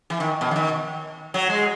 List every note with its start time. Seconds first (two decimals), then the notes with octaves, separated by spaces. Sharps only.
0.10 E3
0.20 D#3
0.41 B2
0.51 E3
0.56 D#3
1.34 F#3
1.49 G#3